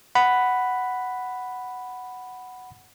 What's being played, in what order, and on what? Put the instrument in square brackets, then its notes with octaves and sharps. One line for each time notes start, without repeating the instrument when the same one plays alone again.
[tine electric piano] F#5 B5